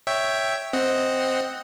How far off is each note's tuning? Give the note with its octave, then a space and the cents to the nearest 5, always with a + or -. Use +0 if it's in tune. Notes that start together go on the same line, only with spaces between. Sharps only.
C#5 +0 E5 +0 G5 +0
C4 +0 D#5 +0 F#5 +0